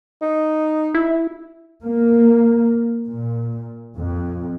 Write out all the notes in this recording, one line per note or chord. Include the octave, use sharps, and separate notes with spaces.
D#4
E4
A#3
A#2
F2